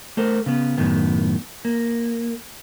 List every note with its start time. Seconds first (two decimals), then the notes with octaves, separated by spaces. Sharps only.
0.17 A3 A4 A#4 C5
0.46 C#3 B3
0.77 F#2 A2 D#3 B3
1.65 A#3